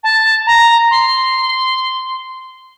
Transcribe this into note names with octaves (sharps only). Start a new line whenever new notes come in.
A5
A#5
C6